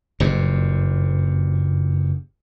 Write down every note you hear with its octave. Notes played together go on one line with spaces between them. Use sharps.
F#1 G2 A#2